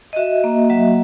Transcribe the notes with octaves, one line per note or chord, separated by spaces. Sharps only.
D#5
F#4 E5
A#3
F#3 E5